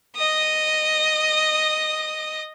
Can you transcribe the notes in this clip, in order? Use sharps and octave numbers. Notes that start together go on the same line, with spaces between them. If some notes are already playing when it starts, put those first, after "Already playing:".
D#5 D#6